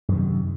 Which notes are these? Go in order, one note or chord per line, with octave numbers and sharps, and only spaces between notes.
F#2 C3 D#3